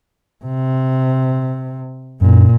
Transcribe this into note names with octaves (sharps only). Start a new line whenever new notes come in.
C3
F#2 A#2